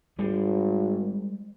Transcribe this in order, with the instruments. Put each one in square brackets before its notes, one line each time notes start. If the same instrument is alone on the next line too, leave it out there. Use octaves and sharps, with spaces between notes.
[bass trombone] G#1 [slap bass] G3 G#3